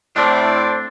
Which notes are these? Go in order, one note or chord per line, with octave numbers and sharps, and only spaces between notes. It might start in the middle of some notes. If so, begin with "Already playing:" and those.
A2 A3 C4 D4 C5 D5